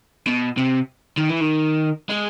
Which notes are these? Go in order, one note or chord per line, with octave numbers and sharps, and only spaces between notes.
B2
C3
D#3
E3
D#3
G#3